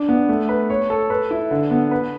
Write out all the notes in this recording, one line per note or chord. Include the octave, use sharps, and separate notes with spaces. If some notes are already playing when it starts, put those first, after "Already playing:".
Already playing: D4
B3
A3
B4
C#5
A4
B4
E4
D3
B3
B4